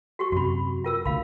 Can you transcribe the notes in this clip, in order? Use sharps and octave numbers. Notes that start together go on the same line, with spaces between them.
F#4 G4 C#6
F#2 C3 F#4 B5
F4 A#4 E6
C2 D3 A3 F5 B5